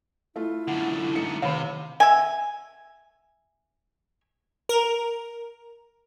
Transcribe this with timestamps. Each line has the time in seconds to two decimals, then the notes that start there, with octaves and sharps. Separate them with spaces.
0.36 A3 E4 F4
0.68 F#2 D3 F#5
1.16 A3 D#4 C#7
1.42 C3 D#3 C#5 F5
2.00 E5 G#5
4.69 A#4